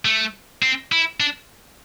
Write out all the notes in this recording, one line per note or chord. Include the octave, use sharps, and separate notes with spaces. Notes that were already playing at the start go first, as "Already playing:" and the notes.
A3
C4
E4
D4